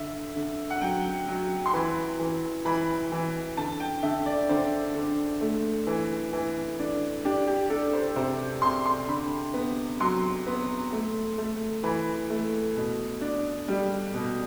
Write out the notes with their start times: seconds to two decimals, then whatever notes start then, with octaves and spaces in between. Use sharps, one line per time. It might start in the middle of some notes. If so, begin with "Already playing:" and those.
Already playing: D3 E5
0.36 D3
0.70 F#5
0.81 F#3 G5
1.28 F#3
1.66 C6
1.74 E3 B5
2.19 E3
2.65 E3 B5
3.12 E3
3.57 D3 A5
3.80 G5
4.03 D3 E5
4.26 D5
4.49 D3 C5
4.94 D3
5.41 A3
5.87 E3
6.33 E3
6.79 D4
7.25 D4 G4
7.47 G4
7.70 D4 A4
7.93 C5
8.16 C3 C5
8.62 C3 C6
8.86 C6
9.08 D3 B5
9.54 B3
10.00 F#3 C6
10.47 B3
10.92 A3
11.38 A3
11.83 E3 B5
12.30 A3
12.76 B2
13.21 D4
13.68 G3
14.14 B2